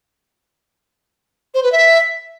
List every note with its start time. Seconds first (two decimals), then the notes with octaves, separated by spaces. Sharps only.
1.54 C5
1.63 B4
1.72 E5